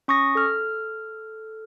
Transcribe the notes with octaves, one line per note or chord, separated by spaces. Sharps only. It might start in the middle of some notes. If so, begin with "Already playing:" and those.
C#4 C#6 D#6 A#6
A4 F6